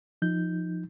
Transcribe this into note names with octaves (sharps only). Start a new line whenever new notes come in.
F3 D#4 G6